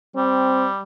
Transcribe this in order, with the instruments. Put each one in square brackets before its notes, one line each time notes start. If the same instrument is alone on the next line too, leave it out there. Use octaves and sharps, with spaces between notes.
[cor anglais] G3 [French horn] C4